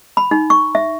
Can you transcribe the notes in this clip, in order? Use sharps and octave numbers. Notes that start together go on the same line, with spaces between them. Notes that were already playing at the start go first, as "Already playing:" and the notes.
B5
D#4
C#6
E5